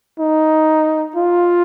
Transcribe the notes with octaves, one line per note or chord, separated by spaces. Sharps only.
D#4
F4